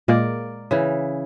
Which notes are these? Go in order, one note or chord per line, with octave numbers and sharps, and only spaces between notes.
A#2 G#3 A#3 A#4 D5
C#3 E3